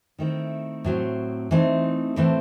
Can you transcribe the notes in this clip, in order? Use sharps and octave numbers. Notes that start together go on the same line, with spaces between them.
D#3 A3 C4 E4
A2 F#3 C4
E3 A3 C4 D#4
A2 E3 A3 C4